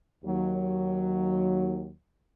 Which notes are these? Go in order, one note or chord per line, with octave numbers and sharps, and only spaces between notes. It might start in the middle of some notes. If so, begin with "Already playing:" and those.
D#2 F#3